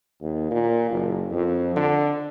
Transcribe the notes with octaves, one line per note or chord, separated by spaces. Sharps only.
D#2
A#2
F#1
F2
D3